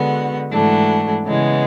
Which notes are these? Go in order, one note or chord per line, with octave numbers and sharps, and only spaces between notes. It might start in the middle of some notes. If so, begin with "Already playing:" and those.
Already playing: D3 G#3 B3 F#4
G#2 E3 A3 D4 F#4
C#3 E3 G#3 B3